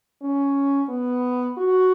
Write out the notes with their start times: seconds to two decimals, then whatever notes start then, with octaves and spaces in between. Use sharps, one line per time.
0.22 C#4
0.89 B3
1.57 F#4